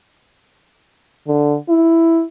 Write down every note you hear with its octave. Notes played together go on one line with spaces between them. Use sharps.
D3
E4